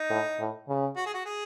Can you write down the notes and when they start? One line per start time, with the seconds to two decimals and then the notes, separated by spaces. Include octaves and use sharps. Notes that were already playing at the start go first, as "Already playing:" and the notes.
Already playing: D#4
0.10 A2
0.39 A2
0.68 C#3
0.97 F#4
1.06 G#4
1.14 F#4
1.25 G#4